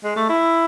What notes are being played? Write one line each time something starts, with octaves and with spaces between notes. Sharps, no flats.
G#3
A3
E4